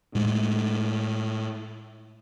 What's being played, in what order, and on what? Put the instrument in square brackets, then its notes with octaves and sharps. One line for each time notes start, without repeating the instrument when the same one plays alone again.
[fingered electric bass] A2 G#3